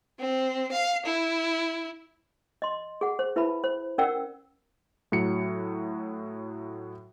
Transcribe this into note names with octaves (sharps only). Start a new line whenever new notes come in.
C4
F5
E4
D#5 C6
G#4 F#5
C5
E4 B4 E5 A5 B5
C5
C#4 A#4 D5 F#5 G5 E6
A2 F#3 C#7